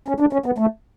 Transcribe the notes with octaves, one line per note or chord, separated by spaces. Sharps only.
C#4
D4
C#4
B3
A3